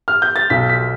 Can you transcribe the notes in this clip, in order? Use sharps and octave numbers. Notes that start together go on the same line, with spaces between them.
F6
G6
A6
B1 B6
B6